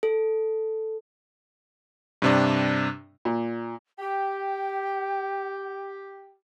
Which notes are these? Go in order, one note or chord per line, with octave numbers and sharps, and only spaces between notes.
A4
G2 C3 D4
A#2
G4 G5